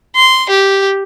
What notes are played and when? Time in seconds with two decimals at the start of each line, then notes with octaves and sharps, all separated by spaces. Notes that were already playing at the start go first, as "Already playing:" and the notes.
0.16 C6
0.49 G4